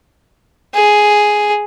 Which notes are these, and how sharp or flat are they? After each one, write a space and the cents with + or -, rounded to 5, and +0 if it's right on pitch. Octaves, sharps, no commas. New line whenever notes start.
G#4 +5